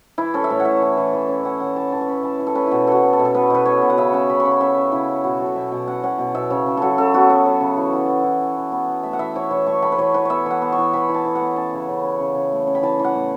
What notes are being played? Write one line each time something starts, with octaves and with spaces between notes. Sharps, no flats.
E3 E4
C#4 A4
E5
A2 C#5
F#5
A2 E5
E3
E3
E3
C#4
C#4 F#5
E3 F#5
E3 A5
E3 A5
C#6
C#4 B5
E3 A5
E3
A4
C#4 B4
B2 E4 F#4
B3 F#4 A4
B3
A4
B2
A4
B3 B4
B2 B4
B3 C#5
B2
F#5
C#3 E5
C#4 F#5
C#3 B5
C#6
C#3 B5
C#4 E5
C#4
C#3 E4
C#4
B2 F#4
F#3 A4
B2 E5
B2 F#5
C#4 F#5
C#4 F#5
B2
B2 E5
C#3 C#5
C#3
F#3 F#4 A4
C#3 A4
B3 F#4
B3
F#3
C#3
E3
E3
B3
E3
E3
E3
B3
B3
A3 E5
F#5
E3 E5
E3 C#5
E3 C#5
A3 C#6
A3 B5
B4
E3 C#5
E3 B4
B3 C#5 E5
E3 F#5
B3
C#6
E3
E3 B5
E3
A5
E3
F#5
B3
C#4 A5
C#3
C#3
C#4
C#3
C#3
A3
C#4
B5
E3 A5
E3 F#5
A2